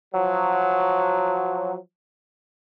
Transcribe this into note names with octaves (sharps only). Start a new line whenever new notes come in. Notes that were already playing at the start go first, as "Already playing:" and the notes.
F3 F#3